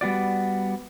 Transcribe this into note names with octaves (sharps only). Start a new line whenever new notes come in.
G3 B3 F#4 D5